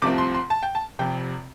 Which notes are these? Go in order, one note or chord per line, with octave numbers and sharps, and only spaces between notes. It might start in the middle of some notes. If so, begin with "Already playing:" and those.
C2 C3 F3 A3 C4 D6
C6
C6
A5
G5
A5
F1 F2 C3 G5